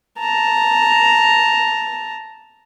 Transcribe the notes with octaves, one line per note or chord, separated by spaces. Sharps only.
A5 A#5